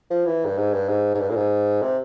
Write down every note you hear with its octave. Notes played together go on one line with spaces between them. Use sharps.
F3
E3
G2
G#2
G2
G#2
G#2
G2
A#2
G#2
C3